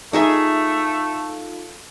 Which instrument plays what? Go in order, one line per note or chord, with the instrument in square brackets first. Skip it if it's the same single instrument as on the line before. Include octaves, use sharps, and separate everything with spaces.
[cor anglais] A3 [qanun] D#4 G#4 E5 [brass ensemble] F4 A4